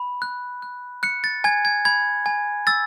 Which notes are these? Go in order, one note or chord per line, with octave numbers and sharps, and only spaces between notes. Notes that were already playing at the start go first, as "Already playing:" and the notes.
Already playing: B5
F#6
F#6
F#6 C#7
A6
G#5 G#6
G#6
B5 G#6
G#5
E6 A6